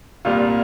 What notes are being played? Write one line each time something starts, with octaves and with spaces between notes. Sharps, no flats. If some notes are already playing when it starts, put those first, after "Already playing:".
C2 A#2 G3 F4